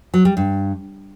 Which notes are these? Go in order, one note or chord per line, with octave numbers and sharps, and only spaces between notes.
F#3
G3
G2